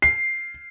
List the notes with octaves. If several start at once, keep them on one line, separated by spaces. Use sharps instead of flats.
C7